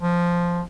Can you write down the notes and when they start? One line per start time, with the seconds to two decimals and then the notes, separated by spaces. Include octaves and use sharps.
0.01 F3